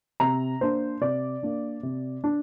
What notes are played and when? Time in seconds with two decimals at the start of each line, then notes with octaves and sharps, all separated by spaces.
0.20 C3 A#5
0.61 A#3 D4 C5
1.01 C3 D5
1.43 A#3 D4
1.83 C3
2.24 D4